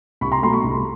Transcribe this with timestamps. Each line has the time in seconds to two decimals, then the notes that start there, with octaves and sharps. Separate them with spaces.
0.21 C2 B5 C#6
0.32 A#5 C6
0.42 B2 F#3 A3 A#5 C6
0.53 B5 C#6
0.64 C2